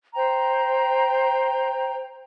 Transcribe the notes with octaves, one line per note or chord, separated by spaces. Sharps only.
C5 G5 A#5